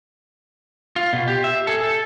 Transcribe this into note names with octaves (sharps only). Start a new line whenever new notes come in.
F4
B2
G4
E5
G#4 A4
A4